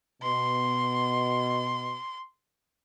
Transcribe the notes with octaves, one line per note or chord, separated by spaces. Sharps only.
B2 C6